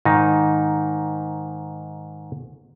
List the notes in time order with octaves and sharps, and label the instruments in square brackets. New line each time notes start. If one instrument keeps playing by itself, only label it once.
[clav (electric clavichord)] G#2 D#3 D#4